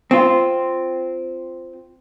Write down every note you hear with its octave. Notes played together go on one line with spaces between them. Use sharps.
C4 F4